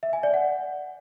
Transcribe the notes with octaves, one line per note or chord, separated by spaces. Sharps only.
E5
G#5
D5
F#5